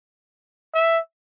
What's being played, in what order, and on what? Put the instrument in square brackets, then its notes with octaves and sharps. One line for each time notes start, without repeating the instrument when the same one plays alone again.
[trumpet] E5